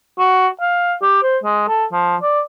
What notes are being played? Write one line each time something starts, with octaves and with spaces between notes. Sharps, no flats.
F#4
F5
G4
C5
G#3
A4
F3
D5